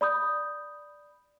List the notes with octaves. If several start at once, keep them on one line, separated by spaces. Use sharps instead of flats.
D5 B5 D#6 G6